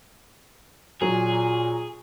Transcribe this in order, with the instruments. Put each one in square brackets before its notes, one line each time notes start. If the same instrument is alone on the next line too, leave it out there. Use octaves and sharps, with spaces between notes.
[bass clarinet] A#2 [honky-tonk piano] F#3 [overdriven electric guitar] G#4